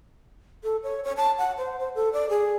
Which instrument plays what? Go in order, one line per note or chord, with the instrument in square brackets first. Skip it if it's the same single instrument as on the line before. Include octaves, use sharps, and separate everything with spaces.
[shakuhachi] A4
C#5
C#5
A5
F#5
C5
C5
A4
D5
G#4